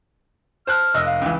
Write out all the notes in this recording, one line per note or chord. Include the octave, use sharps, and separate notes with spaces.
C5 A5 F6 F#6
F1 D#5 E6
F5
C#2 E3